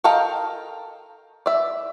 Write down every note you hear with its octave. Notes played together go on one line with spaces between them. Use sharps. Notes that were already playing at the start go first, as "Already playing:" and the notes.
A4 A#4 D#5 F5 G5
D5 E5